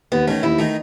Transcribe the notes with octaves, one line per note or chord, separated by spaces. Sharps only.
D#2 B3
D#3 A3 C#4
D#2 E4
D#3 A3 D#4